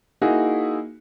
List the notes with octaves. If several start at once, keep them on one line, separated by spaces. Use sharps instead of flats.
A#3 D#4 E4 F#4 G#4